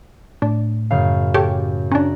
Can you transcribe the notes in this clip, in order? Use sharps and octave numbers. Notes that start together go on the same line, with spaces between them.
A2 D4
F#2 C#3 F5
G4 A4 C#5
C#4 D4 A#5 F#6